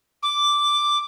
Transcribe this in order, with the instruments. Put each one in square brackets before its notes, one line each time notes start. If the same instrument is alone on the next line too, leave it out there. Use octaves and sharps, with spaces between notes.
[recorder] D6